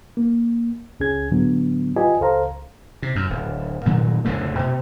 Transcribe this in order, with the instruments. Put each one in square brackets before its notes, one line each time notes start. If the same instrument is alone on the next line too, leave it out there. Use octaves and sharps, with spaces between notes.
[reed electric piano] A#3
C#2 C#4 G#4 G#6
A2 D3 F#3 B3
F4 G4 B4 D5 D#5 G#5
C#2 A4 C5 F5 A#5
[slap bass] C3
F#2
D1
G2 A#2 D#3 F#3
D1 F2 C#3 A3
B2